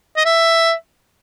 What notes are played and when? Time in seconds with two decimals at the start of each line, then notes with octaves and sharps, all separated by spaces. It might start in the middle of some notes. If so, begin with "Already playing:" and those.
0.17 D#5
0.25 E5